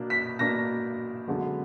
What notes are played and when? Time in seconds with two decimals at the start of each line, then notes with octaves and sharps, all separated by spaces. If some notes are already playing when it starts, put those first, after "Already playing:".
Already playing: B2 A#3 D4
0.10 B6
0.39 B2 A#3 D4 A#6
1.27 F#2 D3 G#3 B3